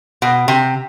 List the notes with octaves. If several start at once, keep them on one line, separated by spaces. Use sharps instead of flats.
B2
C3